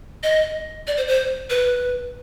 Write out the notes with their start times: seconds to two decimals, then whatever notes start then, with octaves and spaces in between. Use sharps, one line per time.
0.23 D#5
0.87 D5
0.97 C5
1.08 C5
1.50 B4